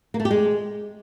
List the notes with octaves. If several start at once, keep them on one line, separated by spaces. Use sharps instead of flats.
A#3
A3
G4
G#3